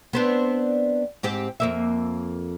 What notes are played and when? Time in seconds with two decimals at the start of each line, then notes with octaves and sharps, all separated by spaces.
0.13 B3 C4 D4
1.23 G#2 C4 G4
1.60 F2 A#3 E5